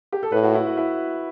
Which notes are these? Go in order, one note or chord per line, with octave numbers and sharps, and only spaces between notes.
G4
A4
A2 B4
F#4
E4
F#4
E4